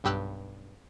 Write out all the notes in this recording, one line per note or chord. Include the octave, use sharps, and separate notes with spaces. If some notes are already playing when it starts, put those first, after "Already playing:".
B1 G2 G4 E6 F#6